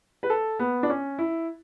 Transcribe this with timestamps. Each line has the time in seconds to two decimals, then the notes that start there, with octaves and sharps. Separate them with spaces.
0.23 B4
0.30 A4
0.59 B3
0.83 D4
0.90 C#4
1.18 E4